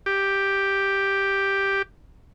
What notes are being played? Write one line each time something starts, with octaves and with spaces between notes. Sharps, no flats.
G4